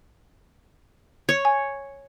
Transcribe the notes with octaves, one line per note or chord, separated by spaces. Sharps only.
C#5
G#5